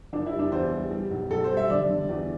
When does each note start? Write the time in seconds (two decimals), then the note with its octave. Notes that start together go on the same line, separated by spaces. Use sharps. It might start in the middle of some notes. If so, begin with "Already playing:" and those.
0.13 F#1 D4
0.26 E4
0.32 G3
0.39 D4
0.52 E2 C5
0.72 G3
0.91 G3
1.11 B1
1.31 B1 A4
1.44 C5
1.50 G3
1.57 E5
1.70 D3 D5
1.89 D3
2.09 E2